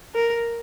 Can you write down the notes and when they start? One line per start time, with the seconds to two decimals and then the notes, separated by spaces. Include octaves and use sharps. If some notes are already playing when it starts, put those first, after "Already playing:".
0.15 A#4